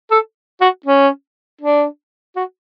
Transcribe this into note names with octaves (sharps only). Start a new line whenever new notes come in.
A4
F#4
C#4
D4
F#4